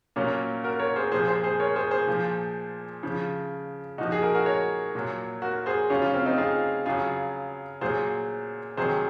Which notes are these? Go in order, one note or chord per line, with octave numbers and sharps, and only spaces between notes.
A#2 F#3 A#3 C#4
F#4 A#4
A#4 C#5
G#4 C5
A#2 F3 G#4 C5
G#4 C5
G#4 C5
A#4 C#5
G#4 C5
G#4 C5
A#2 F3
C#3 F3
A#2 F3 D#4 F#4
G#4
F#4 A#4
F#4 A#4
A#4 C#5
A#2 F#3
F#4 A#4
G#4 C5
C#3 F#3 C#4 F4
C#4 F4
C4
C4 D#4
F4 G#4
C#3 F#3 F4 G#4
A#2 F#3 G#4 C5
C3 D#3 F#3 G#4 C5